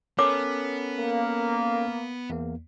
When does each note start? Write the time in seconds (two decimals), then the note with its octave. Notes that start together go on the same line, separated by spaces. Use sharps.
0.19 B3 C#4 A4 A#4 C#5 D6
0.97 A#3
2.30 E2 A#3